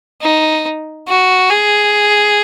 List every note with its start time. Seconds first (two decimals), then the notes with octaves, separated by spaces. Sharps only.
0.22 D#4
1.09 F#4
1.50 G#4